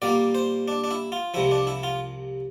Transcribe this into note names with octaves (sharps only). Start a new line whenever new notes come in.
A#2 G3 A#3 D5
C5
D4
D4
E4
F4
C2 C3 F3 E4
D4
E4
F4